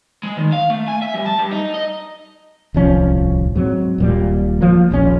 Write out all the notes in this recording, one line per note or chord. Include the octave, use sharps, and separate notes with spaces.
G#3
D#3
F5
A3
G#5
E5
G2
A5
G2
D#4
D#5
D1 C2 F3 C#4
G#2 F#3 C4
D#1 A#2 G3
F3 A#3
D#1 A#1 G#2 C#4